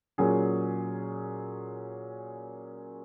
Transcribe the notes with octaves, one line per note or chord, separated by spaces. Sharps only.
A#2 F#3 C#4 G#4